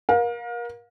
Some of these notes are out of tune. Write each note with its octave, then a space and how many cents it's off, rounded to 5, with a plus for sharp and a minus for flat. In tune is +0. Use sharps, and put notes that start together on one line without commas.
A#4 +30 F5 +35